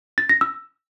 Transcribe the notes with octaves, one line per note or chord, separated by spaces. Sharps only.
A6
A#6
E6